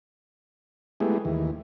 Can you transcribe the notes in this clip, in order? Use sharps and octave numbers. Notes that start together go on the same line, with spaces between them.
G#3 A3 B3 E4 G4 G#4
D#2 E3